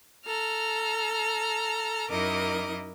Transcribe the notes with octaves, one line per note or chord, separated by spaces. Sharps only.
A4 A#5 F6
F#2 D#4 E4 A#4 D#5 D6